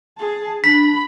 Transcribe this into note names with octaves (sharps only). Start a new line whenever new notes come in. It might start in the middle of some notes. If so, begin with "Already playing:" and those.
G#4 A5
D4 B5 B6